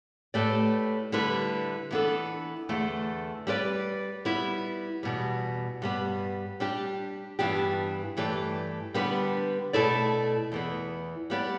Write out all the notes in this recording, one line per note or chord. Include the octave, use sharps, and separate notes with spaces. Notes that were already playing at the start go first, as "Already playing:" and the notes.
A2 A3 G4 B4 D5
D3 G3 E4 B4
E3 B3 D4 A4
E2 D3 A3
G3 E4 B4 D5
G3 B3 E4
E2 B2 G3
G2 G3 B3
G3 D4 G4
G2 E3 B3 D4 G4
G2 E3 A3 G4 D5
D3 G3 B3 D4 B4
B2 A3 E4 A4 D5
E2 E3 B3
G3 B3 G4 D5